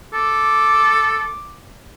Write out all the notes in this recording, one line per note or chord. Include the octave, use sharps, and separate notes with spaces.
A4 D6